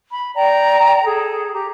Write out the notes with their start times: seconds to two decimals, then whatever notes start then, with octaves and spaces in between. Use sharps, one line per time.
0.12 B5
0.36 D5 G5 A#5
1.04 G#4 A4
1.53 G4 A#5